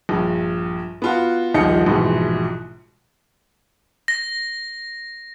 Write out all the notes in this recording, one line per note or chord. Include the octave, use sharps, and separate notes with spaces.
A#1 G2
B3 F4 F#4
D#1 A#1 D#3 F3 D#5 C#7
A#1 G#2 B2 E3
A#6